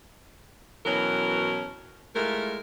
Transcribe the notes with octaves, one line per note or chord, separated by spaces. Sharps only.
B2 E3 F#3 C#4 F#4 A#4
G#3 A3 E4 F4 A#4